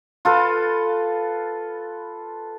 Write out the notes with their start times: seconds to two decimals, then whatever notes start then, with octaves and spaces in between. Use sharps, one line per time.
0.25 F4 A4 B4